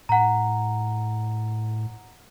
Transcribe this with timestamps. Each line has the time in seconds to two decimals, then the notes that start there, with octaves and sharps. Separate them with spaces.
0.09 A2 F#5 A#5